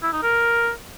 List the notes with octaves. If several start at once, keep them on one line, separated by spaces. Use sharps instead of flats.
E4
D#4
A#4